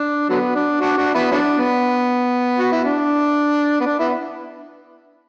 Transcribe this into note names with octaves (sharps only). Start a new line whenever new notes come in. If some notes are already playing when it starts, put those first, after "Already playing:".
Already playing: D4
D3 F#3 B3
D4
D4 F#4
D4 F#4
B3 E4
F#3 B3 D4
B3
F#4
E4
D4
B3
D4
B3 E4